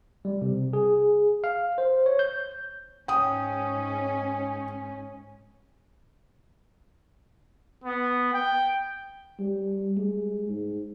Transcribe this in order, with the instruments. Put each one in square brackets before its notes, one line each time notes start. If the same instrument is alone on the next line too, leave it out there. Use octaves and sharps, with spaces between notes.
[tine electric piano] G3
C3
G#4
F5
C5
C#5
G6
[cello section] G#2 C#4 [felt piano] G5 D#6
[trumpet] B3
G5
[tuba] G3
G#3
G#2